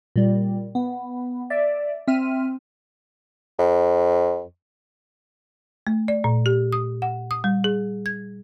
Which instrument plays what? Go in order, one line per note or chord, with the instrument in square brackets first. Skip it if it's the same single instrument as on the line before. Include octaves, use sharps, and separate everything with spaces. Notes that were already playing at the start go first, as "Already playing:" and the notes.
[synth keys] A#2 G3
B3
D5 E5
C4 E5 F6 D#7
[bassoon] F2
[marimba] A3
D5
A#2
G4
D#6
F#5
D#6
G3
G#4
G#6